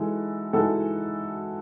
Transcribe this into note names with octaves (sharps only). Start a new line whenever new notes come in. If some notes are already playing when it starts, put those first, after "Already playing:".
Already playing: E3 G#3 D#4 F#4 A4
E3 G#3 D#4 F#4 A4